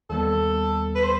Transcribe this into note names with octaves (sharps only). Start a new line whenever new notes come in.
D#2 D#3 G3 B3 A4
B4
C5